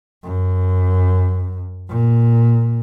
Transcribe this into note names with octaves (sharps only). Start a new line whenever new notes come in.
F#2
A#2